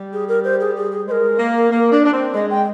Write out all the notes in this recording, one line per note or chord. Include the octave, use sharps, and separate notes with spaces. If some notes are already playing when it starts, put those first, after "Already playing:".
Already playing: G3
G#4
A#4
C5
G#4
G#4
G#4
G#3 A#4 C5
A#3
A#3
D4
D4
C4
G#3 D#5
G5